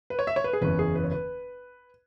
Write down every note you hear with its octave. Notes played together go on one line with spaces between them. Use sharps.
B4
C#5
E5
C#5
B4
G#4
F#1 E2 E3 C#4 B4
G#4
B4
C#5
B4